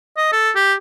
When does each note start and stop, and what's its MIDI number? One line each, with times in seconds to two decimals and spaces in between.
0.17 0.29 75
0.32 0.50 69
0.55 0.74 67